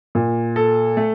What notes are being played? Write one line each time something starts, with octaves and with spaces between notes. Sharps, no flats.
A#2
A4
A3